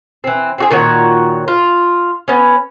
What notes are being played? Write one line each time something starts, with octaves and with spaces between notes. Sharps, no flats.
E3 C4
C4 F#4 G#4
A#2 D#3 F#4 C#5
F4
B3 C#4